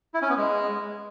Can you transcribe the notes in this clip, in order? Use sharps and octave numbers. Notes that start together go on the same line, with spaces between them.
E4
C#4
B3
G#3